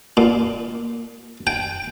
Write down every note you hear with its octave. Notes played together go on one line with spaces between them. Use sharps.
A#2
G5